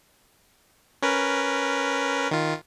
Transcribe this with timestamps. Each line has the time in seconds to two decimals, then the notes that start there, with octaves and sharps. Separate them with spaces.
1.02 C#4 A#4 B4
2.31 D#3 F4